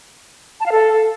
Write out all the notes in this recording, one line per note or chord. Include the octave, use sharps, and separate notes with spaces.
A5
F5
A4